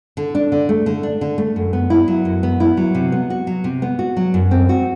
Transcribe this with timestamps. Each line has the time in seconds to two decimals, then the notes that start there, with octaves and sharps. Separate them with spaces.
0.17 D3
0.35 D4
0.52 D3
0.69 A3
0.86 D3
1.03 D4
1.21 D3
1.38 A3
1.56 F#2
1.73 B3
1.90 E4
2.08 F#3
2.25 F#2
2.43 B3
2.60 E4
2.77 F#3
2.95 C3
3.12 B3
3.30 F#4
3.47 F#3
3.64 C3
3.82 B3
3.99 F#4
4.17 F#3
4.34 F#2
4.51 C4
4.69 F#4